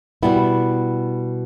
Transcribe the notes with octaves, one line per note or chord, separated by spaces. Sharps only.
B2 G3 B3 E4